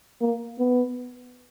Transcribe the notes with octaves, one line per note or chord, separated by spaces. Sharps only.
A#3
B3